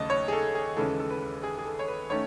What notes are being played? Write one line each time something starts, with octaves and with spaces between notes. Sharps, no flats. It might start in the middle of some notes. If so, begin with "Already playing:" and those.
Already playing: D#2 C#3 F#3 A3 C#4 D#5 A5
C#5
G#4
A4
G#4
D#2 C#3 E3 G#3 C#4 A4
A4
B4
G#4
G#4
A4
C#5
B4
D#3 A3 C#4 C#5